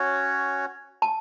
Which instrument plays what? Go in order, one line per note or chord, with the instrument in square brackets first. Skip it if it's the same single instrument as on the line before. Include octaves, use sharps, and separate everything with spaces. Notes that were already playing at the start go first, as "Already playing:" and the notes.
Already playing: [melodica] C#4 F#4 C#5
[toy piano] A5